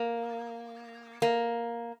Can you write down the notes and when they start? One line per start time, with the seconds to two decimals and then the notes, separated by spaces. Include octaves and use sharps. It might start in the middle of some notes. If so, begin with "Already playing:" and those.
Already playing: A#3
1.22 A#3